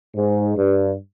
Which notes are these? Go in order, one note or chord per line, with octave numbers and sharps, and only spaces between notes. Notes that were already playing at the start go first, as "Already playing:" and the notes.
G#2
G2